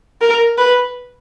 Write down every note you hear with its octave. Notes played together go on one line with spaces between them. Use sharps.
A#4
B4